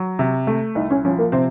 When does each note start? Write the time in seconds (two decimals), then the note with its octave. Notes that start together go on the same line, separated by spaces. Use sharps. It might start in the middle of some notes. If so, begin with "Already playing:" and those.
Already playing: F#3
0.19 C3
0.47 A3
0.75 C2 D#4
0.90 C#4
1.05 F3 C#4
1.18 A#3
1.32 C3 C4